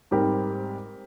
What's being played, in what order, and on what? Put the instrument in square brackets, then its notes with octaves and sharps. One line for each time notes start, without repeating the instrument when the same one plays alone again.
[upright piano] G#2 G3 C4 G4 A#4